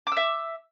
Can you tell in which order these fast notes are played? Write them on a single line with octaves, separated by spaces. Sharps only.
D6 E6 E5